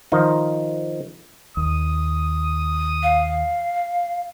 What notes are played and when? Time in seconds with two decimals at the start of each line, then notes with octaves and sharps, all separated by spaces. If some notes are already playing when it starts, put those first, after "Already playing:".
0.12 D#3 F3 D#4
1.57 D#2 D#6
3.03 F5